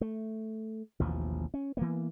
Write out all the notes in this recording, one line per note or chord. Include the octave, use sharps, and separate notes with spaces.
A3
A1 D#2 B2 F3
C#4
E3 A#3 B3